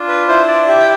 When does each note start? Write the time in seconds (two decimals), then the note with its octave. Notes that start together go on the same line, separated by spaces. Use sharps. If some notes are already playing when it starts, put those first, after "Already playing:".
Already playing: D4 F4
0.08 B4
0.28 E4 C5
0.48 D5
0.68 G4 E5
0.80 G5